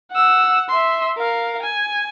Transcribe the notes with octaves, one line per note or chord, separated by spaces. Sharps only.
F#5 E6
E5 C6
A#4 F5
G#5